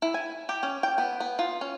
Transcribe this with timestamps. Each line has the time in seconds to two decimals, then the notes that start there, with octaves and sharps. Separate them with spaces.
0.02 E4
0.14 G#5
0.49 G4
0.63 C#4
0.83 G5
0.98 B3
1.20 B3
1.39 F4
1.61 C#4